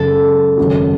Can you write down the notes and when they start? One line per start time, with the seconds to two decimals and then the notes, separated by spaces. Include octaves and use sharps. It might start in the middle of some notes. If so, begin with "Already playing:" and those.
Already playing: F#2 C#3 G#3 A4
0.58 G#1 F#2 C#3 F#3